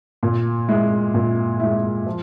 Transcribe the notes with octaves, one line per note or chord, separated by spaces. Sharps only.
A#2
G#3 E4
A#2
G#3 E4
F3